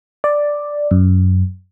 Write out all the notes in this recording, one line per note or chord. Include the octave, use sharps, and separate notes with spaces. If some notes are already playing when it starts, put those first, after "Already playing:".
D5
F#2